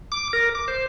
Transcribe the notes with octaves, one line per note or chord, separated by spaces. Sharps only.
D6
A#4
D6
C5